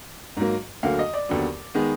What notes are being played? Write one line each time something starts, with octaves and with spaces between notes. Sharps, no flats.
G#2 F#3 A#3
D2 D3 F#3 A#3 F5
D#5
D5
D#2 D3 F#3 B3
D#3 G#3 B3